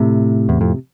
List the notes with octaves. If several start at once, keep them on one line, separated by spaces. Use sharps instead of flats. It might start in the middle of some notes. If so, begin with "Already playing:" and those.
Already playing: A2 C3
E2
F2